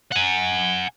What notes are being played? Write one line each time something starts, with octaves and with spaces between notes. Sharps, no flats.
F#5 G#5